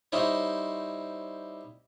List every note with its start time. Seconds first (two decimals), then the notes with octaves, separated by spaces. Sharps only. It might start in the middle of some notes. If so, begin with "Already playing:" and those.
0.12 G3 D#4 E4 C5 C#5